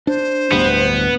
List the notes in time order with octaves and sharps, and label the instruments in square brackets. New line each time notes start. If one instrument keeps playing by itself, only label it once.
[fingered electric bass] D4 [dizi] C5
[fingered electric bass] D1 D2 G2 [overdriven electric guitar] B3